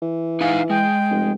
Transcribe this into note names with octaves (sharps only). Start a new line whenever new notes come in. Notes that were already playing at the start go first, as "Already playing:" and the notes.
E3
D#4 F5 F#5 G#5
G#3 G5
F1